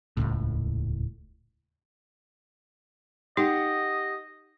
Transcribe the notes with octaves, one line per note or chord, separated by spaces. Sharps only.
D#1 G#1 C#2 A2
D#4 G4 D#5 F#5